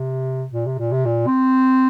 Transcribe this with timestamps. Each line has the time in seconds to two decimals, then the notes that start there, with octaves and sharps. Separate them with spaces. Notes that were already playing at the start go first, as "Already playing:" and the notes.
Already playing: C3
0.52 A#2
0.66 C3
0.78 A#2
0.92 C3
1.05 A#2
1.26 C4